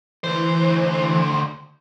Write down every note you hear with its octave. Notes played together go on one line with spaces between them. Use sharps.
D2 E3 C5